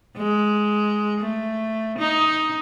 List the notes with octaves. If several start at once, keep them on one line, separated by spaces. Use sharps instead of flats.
G#3
A3
D#4